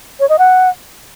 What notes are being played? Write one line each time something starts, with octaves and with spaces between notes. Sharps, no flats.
C#5
D#5
F#5